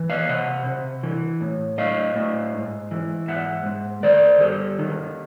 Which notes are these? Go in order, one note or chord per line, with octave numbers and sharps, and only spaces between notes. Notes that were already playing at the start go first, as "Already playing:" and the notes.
Already playing: E3
D#5 F5
C3 E5 F#5
C3
E3
A2
A2 D#5 F5
A2
G#2
E3
G#2 E5 F#5
G#2
D#3 C5 D5
G2 G4 A4
D#3